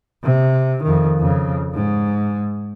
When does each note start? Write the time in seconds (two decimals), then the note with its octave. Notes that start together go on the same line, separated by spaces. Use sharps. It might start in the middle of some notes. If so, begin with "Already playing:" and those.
0.23 C3
0.84 F2 D#3
1.19 F2 C#3
1.74 G#2